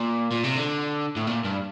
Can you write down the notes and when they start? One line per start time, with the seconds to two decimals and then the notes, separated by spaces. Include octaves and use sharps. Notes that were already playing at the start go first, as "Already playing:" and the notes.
Already playing: A#2
0.31 A#2
0.43 C3
0.55 D3
1.16 A2
1.27 A#2
1.45 G2